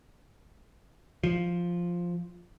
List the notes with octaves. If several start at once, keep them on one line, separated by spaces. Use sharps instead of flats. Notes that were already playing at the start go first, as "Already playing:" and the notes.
F3